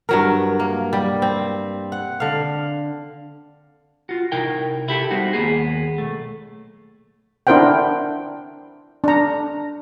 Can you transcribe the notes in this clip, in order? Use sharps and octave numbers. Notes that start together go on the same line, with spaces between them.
G2 F#3 A#4
A#3
G3
C4
F#5
D3 F5
F4 F#4
C3 D#4 E4 A#4 G5
E4 G4 A4
G3 B3 C4 D#4 F#4
D#2 A#3 B3 G#4
B1 A3
D4 E4 A#4 C5 F#5 G5
D4 A#5